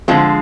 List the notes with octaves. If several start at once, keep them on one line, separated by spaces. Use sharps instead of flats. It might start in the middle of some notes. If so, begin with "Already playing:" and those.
D3 F3 G#3 C4 F4